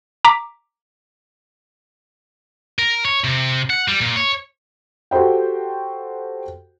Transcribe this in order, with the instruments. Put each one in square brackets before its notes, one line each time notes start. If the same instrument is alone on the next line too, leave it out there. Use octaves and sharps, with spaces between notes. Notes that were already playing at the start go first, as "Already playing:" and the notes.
[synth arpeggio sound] A#5 D6 B6
[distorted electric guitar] A#4
C#5
C3
F#5
G3
A#2
C#5
[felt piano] F#4 G4 A4 C5 G5